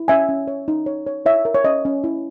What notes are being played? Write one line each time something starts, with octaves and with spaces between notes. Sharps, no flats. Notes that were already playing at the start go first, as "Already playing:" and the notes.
Already playing: E4
C#4 E5 G#5
C#4
C#5
D#4
C#5
C#5
E4 C#5 E5
A#4
C#5
C#4 D#5
C#4
E4